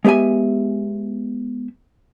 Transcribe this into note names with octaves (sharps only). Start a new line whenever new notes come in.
G#3 B3 G4 E5 G#5